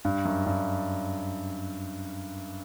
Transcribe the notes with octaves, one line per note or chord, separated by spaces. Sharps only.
G2
F#2
G2